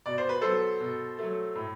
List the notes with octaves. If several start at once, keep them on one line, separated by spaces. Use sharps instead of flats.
B2 D5
C5
B4
F#3 B3 A4 C5
B2
F#3 A3
A2